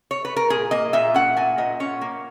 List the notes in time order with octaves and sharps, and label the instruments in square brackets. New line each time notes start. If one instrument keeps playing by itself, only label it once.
[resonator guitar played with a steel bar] C#5
B4
A#4
A#2 G#4
A#3 D#5
A#2 E5
C#4 F#5
A#2 G#5
A#2 D#5
C#4 C#5
A#3